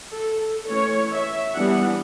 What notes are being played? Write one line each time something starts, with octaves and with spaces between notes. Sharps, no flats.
A4
A4
E3 A3 C#4 C#5
E5
E3 G3 B3 D4 F#5